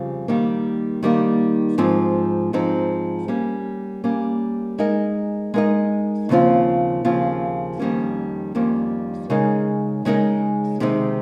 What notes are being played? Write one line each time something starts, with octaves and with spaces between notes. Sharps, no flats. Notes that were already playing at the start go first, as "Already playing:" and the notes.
Already playing: F2 C#3 G3 C4 F4
D#3 G3 A#3 D#4
D#3 G3 A#3 D#4
G#2 F3 C4 D#4
G#2 F3 C4 D#4
G3 A#3 C#4
G3 A#3 C#4
G#3 D#4 A#4 D#5
G#3 D#4 A#4 D#5
D#2 C#3 F3 C4 F4
D#2 C#3 F3 C4 F4
F2 D#3 G3 A#3 C#4
F2 D#3 G3 A#3 C#4
C#3 G#3 D#4 A#4 D#5
C#3 G#3 D#4 A#4 D#5
C3 D#3 G#3 C4 D#4